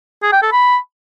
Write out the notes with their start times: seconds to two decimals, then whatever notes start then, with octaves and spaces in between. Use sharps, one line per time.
0.22 G#4
0.32 G5
0.42 A4
0.52 B5